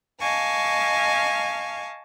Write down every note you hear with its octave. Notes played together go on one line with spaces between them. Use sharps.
D#5 F5 G#5 A5 C#6